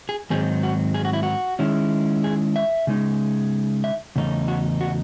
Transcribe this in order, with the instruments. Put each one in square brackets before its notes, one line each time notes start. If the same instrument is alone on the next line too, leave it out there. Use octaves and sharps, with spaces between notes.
[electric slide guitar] G#4
G#2 D#3 F#3 C4 D#4 G#4
F#4
G#4
F#4
E4
F#4
D#3 G#3 C#4 E4
G#4
E5
C#3 G#3 D#4
E5
E2 C#3 A3 D#4
F#4
F#4